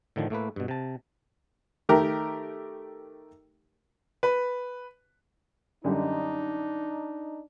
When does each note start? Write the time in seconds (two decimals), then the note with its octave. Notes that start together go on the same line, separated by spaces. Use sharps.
0.16 A2 D3 D#3 F3
0.30 A2 A3 A#3 B4
0.56 G2 B2
0.68 C3 A5
1.89 D#3 A3 G4 A#4
4.23 B4
5.84 F#2 D3 G3 D4 D#4